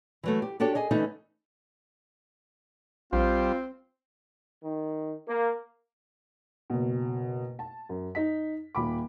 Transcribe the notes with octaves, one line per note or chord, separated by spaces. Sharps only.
E3 F#3 A3
G4
D4 F#4 G4 A4 C#5
G#4 D#5 G#5
D3 E3 A3 C#4 D#4
A#1 G3 C4 F4 C5
D#3
A#3
F#1 B2
A5
F#2
D#4 B6
D#1 B5 D6